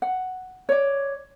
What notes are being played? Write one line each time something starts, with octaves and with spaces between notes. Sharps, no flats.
F#5
C#5 D5